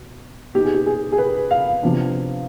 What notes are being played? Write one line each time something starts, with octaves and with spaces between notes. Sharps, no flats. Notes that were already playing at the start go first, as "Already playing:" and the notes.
Already playing: B2
B2 B3 D#4 G4
G#4
G4
G#4
G#4
B4
F5
C3 F3 B3 D4